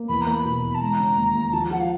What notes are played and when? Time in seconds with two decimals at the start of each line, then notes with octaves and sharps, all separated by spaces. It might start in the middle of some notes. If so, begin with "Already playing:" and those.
Already playing: A#3
0.08 E2 B5
0.21 A#5
0.27 A#3
0.33 B5
0.45 B2
0.63 E2
0.74 A5
0.81 G#3 A#5
0.99 C#3
1.16 D#2
1.35 D#2
1.46 A#5
1.53 F3 A5
1.71 F3 F#5
1.80 F5